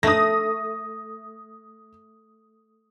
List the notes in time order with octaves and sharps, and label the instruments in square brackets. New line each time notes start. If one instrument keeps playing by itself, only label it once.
[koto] A3 [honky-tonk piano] D#6 A#6